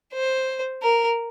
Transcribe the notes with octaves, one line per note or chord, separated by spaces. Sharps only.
C5
A#4